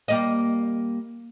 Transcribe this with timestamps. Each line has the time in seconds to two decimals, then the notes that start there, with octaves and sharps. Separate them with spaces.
0.08 G3 A#3 D#5